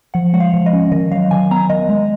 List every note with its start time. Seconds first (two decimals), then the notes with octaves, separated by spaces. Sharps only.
0.14 F3 F#5
0.33 G#3 F#5
0.40 F5
0.54 F3
0.66 D#5
0.73 C#4
0.92 D#3 D#5
1.11 F#3 F5
1.31 D#3 G#5
1.51 B3 A#5
1.70 D#3 D#5
1.89 G#3